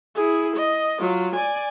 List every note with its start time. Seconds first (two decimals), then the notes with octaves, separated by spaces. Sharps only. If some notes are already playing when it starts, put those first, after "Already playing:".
0.16 E4 G#4
0.56 D#5
1.00 F#3 F4
1.36 D5 G#5